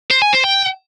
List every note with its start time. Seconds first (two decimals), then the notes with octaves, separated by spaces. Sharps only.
0.11 C5
0.22 G#5
0.33 C5
0.44 G5